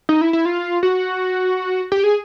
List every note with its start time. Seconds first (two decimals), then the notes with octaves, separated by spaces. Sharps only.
0.09 D#4
0.21 E4
0.33 E4
0.45 F4
0.83 F#4
1.92 G4
2.04 G#4